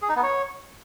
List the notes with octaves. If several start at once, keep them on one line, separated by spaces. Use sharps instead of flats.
G#4
D#4
B3
C#5